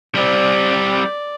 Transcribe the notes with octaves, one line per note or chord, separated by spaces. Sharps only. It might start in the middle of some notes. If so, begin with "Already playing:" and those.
G3 C4 D5